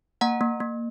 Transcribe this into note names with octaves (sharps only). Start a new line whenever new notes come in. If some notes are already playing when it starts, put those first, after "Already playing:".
A#3 F#5 A#5
A#3
A#3